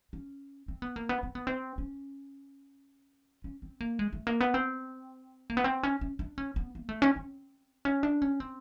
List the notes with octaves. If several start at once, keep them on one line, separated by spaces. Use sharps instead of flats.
C#4
C4
B3
A#3
B3
C4
B3
C4
C#4
C#4
C4
A#3
G#3
A3
A#3
B3
C4
A#3
B3
C4
C#4
C#4
D4
C#4
B3
A#3
A3
C#4
C4
C#4
D4
C#4
C4